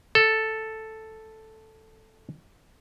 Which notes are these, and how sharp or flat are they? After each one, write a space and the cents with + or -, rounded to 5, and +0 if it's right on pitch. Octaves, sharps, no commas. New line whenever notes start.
A4 +0